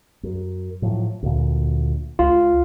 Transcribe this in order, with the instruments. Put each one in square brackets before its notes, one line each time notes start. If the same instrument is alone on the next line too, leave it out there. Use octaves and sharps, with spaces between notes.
[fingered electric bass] F#2
A2 F3 F#3
D2 A#2
[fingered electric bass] C#2 [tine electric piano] F4